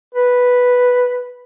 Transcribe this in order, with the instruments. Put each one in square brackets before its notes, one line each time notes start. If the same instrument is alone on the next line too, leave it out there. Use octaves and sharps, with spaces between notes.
[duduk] B4